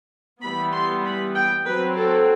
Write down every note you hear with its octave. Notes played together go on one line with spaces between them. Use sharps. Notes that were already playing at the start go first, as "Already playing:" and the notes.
E3 G3 B3 B5
C6
B5
G5
F#3 C4 B4
A4